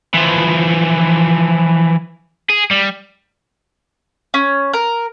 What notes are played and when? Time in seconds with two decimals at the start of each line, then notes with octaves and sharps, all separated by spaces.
0.14 E3 F3
2.50 G#4
2.71 G3
4.34 C#4
4.73 A#4